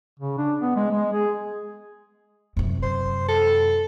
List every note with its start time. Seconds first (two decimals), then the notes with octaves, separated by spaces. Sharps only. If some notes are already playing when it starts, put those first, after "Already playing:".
0.20 C#3
0.38 D4
0.62 B3
0.76 G#3
0.91 G#3
1.13 G#4
2.57 F#2 C3
2.82 C5
3.28 A4